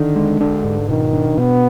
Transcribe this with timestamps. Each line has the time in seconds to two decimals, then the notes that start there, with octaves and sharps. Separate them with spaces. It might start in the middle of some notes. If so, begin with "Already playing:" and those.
Already playing: D3 D#3
0.16 G#3
0.40 D3 D4
0.64 G#2
0.89 B2 D#3
1.13 D4
1.37 B2 B3